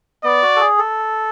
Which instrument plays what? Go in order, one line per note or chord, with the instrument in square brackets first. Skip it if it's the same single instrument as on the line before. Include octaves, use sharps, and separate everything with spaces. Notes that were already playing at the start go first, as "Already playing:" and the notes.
[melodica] B3 [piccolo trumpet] D5
[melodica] F#4
A4
G#4
A4